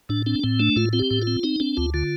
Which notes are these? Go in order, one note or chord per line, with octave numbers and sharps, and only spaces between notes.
A2 D4
C4 D4
A2 C4
A3 D4
A2 F4
C4 F4
G4
A2
F4
C4
C4 D#4
C4 D4
D2 F4
D3 F4